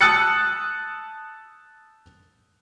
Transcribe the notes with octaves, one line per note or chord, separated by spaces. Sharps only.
A5 D#6 E6 F#6 A6 C#7